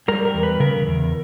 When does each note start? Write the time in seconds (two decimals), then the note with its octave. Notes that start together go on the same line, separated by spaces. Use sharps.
0.08 G3 A#4
0.25 A#4
0.34 E2
0.43 B4
0.60 C#3 A#4
0.87 E2